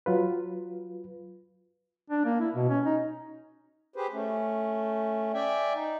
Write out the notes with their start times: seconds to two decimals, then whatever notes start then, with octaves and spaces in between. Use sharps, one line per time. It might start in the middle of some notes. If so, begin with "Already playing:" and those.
0.06 F#3 F4 B4
2.10 D4
2.25 A#3
2.40 E4
2.55 B2
2.69 C#4
2.86 D#4
3.96 G4 G#4 B4 C5
4.13 A3 C#4
5.34 D5 E5 G5 G#5
5.75 D#4